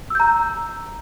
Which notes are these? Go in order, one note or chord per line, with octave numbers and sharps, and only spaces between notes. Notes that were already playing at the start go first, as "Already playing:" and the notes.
A#5 E6 G6